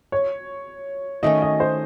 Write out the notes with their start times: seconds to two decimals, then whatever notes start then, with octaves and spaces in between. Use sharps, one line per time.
0.12 C#5
1.23 D#3 A3 C#4 D#5
1.42 D#5
1.60 C5